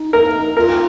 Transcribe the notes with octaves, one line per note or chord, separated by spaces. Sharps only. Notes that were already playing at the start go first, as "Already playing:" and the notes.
Already playing: D#4
A#4
F4 A#4